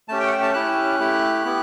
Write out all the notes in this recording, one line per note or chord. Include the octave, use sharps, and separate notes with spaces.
A3 C#4 G4 A5
G5
F#5
G5
A5
C#4 E4 G4 F#6
A3 E4 G4
B3 E4 G4